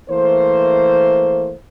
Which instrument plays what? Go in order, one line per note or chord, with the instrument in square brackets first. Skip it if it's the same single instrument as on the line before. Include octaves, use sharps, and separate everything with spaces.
[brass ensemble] E3 A3 A#3 C5